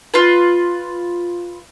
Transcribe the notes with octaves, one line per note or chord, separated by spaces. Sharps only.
F4 B4